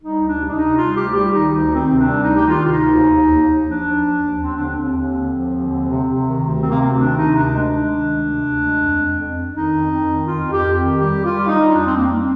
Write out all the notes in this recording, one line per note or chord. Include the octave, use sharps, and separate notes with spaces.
G3 D#4
D2
D4
C3
D4
D#4
C3
G3 F4
D2 G4
G3 G4
D#3 D#4
D2 D#4
D#3
C4
C3
D4
G3
D2 D#4
D#3 G4
F4
C3 F4
D#4
D2
D#2
D#2
D#2
D#2
F3 D4
F3
D#2
D#2
D#2 C4
D3 D4
C4
D#2
D#2
D3
F3
D#2
D3
C3
C3
D#3
D2
C3 C4
A#3
D2 C4
D#3 D4
C3 D#4
D2 D4
G#3
G#3
D#3
D2
C3
D2
G#3
F2
F2
F2
F2
D#3 D#4
F2
F2
D#3
F2 F4
F2
G4
F2
D#3
G3 G4
G3
F4
G3
D#4
G3
F2 D4
C4
F2
A#3
G3 C4